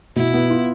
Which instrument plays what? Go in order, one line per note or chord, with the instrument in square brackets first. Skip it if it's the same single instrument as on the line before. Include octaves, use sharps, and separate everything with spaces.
[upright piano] B2 [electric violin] E4
[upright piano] B3
F4